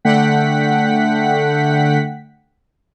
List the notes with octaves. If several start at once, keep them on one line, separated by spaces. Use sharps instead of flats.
D3 A3 F#5 G5 B6